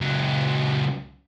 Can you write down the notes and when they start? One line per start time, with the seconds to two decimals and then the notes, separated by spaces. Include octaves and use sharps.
0.01 C#2 F#3